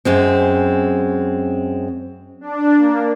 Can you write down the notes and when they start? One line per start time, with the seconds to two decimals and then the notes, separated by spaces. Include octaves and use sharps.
0.05 F#2 G#3 C4
2.41 D4
2.77 A#3